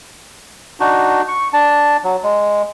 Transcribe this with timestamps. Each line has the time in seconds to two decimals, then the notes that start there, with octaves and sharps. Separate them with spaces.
0.80 D4 D#4 F#4
1.28 C#6
1.53 D4 A5
2.04 F#3
2.24 G#3